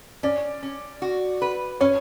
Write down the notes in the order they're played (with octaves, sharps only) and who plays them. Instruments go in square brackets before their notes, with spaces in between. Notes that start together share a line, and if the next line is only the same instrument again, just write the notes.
[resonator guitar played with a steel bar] C#4 [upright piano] D5
[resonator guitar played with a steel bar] C#4
F#4
B4
[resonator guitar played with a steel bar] C#4 [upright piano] C#5